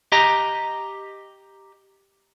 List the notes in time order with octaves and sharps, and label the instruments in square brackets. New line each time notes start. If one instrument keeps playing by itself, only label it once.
[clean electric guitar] G4 D#5 A#5